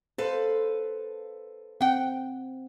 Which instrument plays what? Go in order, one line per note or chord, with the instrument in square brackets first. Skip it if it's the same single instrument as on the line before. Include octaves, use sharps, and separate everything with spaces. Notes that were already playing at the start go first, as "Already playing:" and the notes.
[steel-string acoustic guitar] A4 B4 F5 [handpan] C5
[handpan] C4 [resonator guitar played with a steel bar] F#5 G5